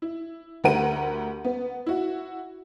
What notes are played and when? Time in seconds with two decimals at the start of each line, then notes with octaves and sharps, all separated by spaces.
0.02 E4
0.64 D2 D3 G4 A#4 F#5 D#7
1.45 B3
1.86 E4 F#4